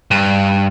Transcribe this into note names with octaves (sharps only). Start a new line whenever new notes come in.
G2